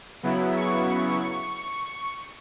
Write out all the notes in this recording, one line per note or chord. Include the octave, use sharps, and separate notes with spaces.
C#3 F#3 B3 E4
C#6